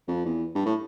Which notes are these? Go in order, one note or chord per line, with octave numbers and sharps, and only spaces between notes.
F2
E2
G2
A2